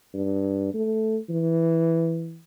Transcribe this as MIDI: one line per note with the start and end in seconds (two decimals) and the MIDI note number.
0.14 0.70 43
0.74 1.19 57
1.30 2.41 52